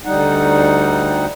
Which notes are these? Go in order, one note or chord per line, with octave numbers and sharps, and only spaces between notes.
D2 G3 D#4 F#5